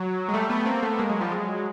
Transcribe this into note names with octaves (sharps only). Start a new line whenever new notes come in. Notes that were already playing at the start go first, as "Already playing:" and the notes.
Already playing: F#3
G#3
G3 A3
A3 B3
A#3 C4
A3 B3
G#3 A#3
F#3 G#3
F3 G3
F#3 G#3